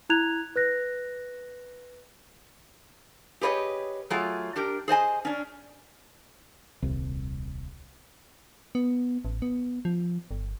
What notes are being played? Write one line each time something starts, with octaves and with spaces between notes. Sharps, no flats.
E4 A#5 F#6 G#6 F7
B4 F#6 A#6
G4 G#4 B4 C#5 D#5
F#3 A3 F4 G#4
D4 G4 A#4
G#4 C5 D#5 G#5
C#4 D4
D#1 C2
B3
A1
B3
F3
G1